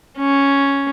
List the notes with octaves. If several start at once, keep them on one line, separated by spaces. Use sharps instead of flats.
C#4